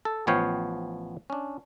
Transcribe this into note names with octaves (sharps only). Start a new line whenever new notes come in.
A4
A1 F3 B3 C#5 F5 G5
C#4 D4